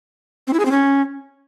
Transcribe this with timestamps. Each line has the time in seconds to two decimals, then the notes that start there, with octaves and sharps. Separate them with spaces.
0.47 C4
0.53 E4
0.59 G#4
0.65 C4
0.71 C#4